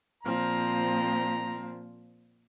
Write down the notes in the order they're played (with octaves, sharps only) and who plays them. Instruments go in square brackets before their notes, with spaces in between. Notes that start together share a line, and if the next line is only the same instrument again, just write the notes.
[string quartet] A#2 F3 C4 [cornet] A#5